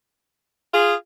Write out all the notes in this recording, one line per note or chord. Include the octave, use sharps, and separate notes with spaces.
F4 G#4